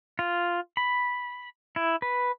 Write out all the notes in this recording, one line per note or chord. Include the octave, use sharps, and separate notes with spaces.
F4
B5
E4
B4